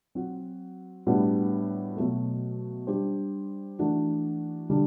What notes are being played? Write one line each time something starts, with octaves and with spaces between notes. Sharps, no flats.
F#3 C4 F#4
A2 G3 B3 D4 F#4
B2 F#3 A3
G3 D4 G4 C5
E3 A3 D4 F#4
D3 G3 D4